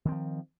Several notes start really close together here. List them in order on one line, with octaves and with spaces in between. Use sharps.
D#3 C4 F3